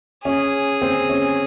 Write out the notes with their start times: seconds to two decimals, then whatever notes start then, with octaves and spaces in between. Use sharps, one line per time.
0.25 C#4 G#4
0.82 C4
1.10 C#4